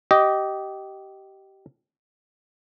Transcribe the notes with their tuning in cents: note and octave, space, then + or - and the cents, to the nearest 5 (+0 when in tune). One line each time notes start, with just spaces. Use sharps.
G4 -20 D#5 +0